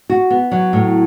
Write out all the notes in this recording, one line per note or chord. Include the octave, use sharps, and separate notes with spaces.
F#4
B3
F#3
A2